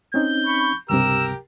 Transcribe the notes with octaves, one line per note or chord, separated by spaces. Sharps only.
C4 C#4 D#4 G6
B5 C#6
C#2 G2 C3 G4 A#4 E6